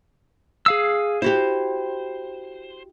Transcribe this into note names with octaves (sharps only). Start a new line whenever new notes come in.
G#4 F5 E6
E4 F#4 G4 C5